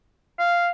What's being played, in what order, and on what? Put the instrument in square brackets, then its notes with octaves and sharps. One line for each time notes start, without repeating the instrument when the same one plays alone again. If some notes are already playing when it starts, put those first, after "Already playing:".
[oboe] F5